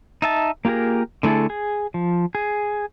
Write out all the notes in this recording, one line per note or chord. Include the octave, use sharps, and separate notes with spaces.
D#4 E5 A5
A#3 F4 G4 G#4 A#4
D3 A3 E4 G#4 A4
G#4
F3
G#4